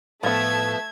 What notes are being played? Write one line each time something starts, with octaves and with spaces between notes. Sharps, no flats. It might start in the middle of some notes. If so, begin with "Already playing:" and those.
A2 F3 A3 B3 E5 A5 G#6